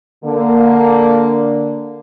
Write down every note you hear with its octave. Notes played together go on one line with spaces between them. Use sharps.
D3 A#3